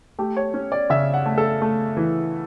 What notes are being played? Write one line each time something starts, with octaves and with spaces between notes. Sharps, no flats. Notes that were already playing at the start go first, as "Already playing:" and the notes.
A3 G4
C#5
C#4
D5
C#3 E5
F#5
A3
A4
A3
E3